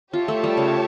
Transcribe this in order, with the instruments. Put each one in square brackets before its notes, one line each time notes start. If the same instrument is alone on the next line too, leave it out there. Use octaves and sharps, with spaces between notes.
[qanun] F4 [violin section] G4 C#5 E5 A5
[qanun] A3
G3
C#3